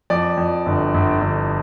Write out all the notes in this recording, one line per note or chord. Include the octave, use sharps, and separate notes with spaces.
F2 D5
F2
G1
G1
G1